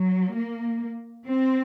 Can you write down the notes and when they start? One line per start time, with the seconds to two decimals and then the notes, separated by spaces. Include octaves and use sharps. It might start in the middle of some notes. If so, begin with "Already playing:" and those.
Already playing: F#3
0.36 A#3
1.27 C4